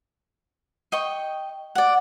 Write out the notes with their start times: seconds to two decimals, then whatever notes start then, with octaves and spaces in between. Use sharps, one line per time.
0.92 D#5 G5 C#6
1.75 D5 F#5